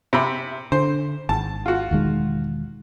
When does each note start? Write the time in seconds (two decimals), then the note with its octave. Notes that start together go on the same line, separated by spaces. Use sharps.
0.13 C3 E5 B5
0.72 D3 C5
1.29 G#1 A5
1.66 F4 F#4
1.91 E1 D#3 G#3